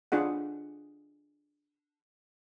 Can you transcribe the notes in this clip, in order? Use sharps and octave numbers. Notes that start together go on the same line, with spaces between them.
D4 F4 G#4 F#5